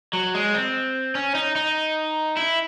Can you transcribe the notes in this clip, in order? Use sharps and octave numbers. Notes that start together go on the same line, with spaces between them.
F#3
G#3
C4
C#4
D#4
D#4
E4